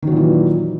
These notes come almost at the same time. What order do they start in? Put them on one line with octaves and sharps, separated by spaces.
D#3 F#3 A#2 E3